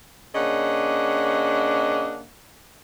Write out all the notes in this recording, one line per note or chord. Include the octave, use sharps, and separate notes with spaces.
C#3 A#3 D4 D#5 F#5